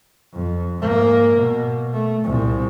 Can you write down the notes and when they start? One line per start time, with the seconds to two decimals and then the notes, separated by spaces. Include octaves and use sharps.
0.34 F2
0.78 G#2 A#3
1.35 B2
1.93 A3
2.24 C2 A#2